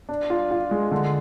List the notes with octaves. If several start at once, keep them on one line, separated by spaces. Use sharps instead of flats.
D4
F4
F4
G#3
D3